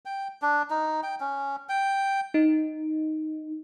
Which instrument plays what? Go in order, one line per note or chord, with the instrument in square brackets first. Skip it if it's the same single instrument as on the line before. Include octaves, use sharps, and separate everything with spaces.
[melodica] G5
D4
D#4
G5
C#4
G5
[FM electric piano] D#4